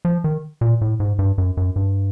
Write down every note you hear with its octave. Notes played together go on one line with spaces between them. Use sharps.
F3
D#3
A#2
A2
G#2
G2
F#2
F#2
G2